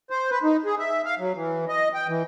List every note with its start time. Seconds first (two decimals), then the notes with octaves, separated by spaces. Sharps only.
0.10 C5
0.31 B4
0.43 D#4
0.65 G#4
0.79 E5
1.05 F5
1.19 F#3
1.35 E3
1.68 D#5
1.94 G5
2.08 E3